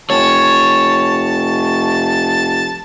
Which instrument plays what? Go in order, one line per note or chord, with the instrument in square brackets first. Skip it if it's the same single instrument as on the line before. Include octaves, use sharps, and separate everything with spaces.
[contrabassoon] F1 [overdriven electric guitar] C#5 [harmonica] A5